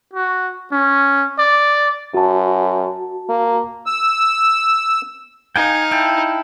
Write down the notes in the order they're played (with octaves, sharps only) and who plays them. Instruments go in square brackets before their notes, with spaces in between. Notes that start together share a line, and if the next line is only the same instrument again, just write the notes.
[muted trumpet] F#4
C#4
D5
[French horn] F#2 [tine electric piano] F#4 A5
[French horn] A#3
[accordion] E6
[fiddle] D#4 [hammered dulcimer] F5 [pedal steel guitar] G5 G#5
[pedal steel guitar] E4 [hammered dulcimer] G5 A5